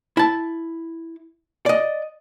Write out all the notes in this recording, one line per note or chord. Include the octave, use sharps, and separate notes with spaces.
E4 A5
D5 D#5